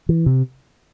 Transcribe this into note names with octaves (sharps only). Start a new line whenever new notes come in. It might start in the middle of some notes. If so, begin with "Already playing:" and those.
E3
C3